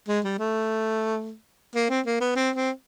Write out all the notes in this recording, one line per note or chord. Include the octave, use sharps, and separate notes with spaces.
G#3
G3
A3
A#3
C4
A#3
B3
C4
C4